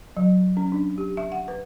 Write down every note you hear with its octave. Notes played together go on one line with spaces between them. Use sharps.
F#3
C#4
D4
G4
E5
F#5
B4